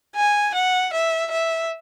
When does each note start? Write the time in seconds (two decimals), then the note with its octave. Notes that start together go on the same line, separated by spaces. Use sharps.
0.16 G#5
0.54 F#5
0.93 E5
1.31 E5